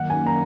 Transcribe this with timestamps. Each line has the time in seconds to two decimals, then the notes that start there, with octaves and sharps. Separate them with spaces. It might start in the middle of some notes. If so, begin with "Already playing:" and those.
Already playing: F#2 D#3 A#3 F#5
0.10 G#5
0.26 A#5